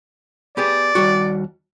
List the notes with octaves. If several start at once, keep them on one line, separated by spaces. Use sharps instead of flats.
B3 G4 G#4 D5
D#2 G3 F#4